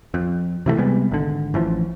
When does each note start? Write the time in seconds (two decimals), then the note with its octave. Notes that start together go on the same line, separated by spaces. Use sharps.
0.14 F2
0.66 C3 E3 F3 A3
0.78 C3 G3 G#3 B3
1.11 G#1 D3
1.54 A1 E3 F3